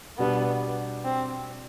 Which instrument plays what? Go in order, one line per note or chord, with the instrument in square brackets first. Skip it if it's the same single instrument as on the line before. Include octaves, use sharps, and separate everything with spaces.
[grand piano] B2 G3 D4 [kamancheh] B3
[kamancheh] C4